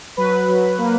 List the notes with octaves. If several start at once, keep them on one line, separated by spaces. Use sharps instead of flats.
F#3 B4
F#3
A#3